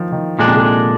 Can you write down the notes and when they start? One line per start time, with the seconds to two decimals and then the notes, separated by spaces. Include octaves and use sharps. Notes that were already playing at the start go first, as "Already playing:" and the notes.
Already playing: D#3 F3
0.12 D#3
0.39 A#2 D3 G#3 D4
0.47 C3
0.56 D3